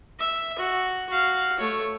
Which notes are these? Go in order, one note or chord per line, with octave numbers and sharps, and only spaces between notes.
E5
F#4
F#4 F5
A3 C#5